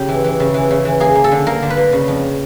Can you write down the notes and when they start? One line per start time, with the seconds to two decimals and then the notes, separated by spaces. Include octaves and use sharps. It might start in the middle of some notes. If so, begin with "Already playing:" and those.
Already playing: C#3 G4
0.09 E3
0.24 E3
0.40 C#3
0.54 E3
0.71 C#3
0.85 E3
1.00 A#3 G#4
1.15 A#3
1.24 A4
1.32 D3
1.47 A#3 A#4
1.62 D3
1.70 B4
1.77 A#3
1.92 C#3
2.08 F2